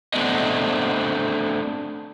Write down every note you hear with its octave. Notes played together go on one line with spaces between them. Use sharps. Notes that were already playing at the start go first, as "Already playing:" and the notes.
A3 B3 C4 D4 B4 D#5